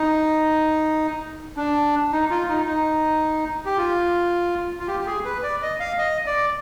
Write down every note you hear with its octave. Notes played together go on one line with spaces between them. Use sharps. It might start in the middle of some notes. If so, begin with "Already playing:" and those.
Already playing: D#4
D4
D#4
F4
D#4
D#4
G4
F4
F4
G4
G4
G#4
B4
D5
D#5
F5
D#5
D5